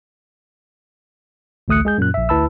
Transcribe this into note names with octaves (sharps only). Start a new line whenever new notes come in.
A1 D2 A3 D#6 F#6 C#7
G#3 G#4 G6
F#2 A#2 F#6
A#1 E5
D2 E4 B4 A5 B5 E6